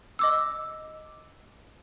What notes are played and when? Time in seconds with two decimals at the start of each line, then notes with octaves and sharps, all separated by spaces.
0.19 D#5 D6 E6